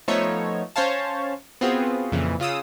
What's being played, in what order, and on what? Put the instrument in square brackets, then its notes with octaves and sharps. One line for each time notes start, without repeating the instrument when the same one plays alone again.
[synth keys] F3 A3 B3 D#4 C#5 E5
C#4 C5 C#5 F5 A5
B3 C4 F4 F#4 G#4
F2 A#2 C#3 E3
C#3 F4 D#6 E6